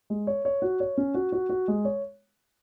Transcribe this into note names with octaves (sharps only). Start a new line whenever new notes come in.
G#3
C#5
C#5
F#4
C#5
C#4
F#4
F#4
F#4
G#3
C#5